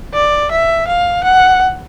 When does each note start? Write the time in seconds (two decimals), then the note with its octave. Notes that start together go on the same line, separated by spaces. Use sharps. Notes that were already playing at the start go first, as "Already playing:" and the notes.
0.14 D5
0.51 E5
0.87 F5
1.24 F#5